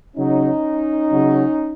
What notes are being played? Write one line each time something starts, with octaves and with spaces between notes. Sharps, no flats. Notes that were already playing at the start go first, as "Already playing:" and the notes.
C#3 F#3 C#4 D#4
C#3 F#3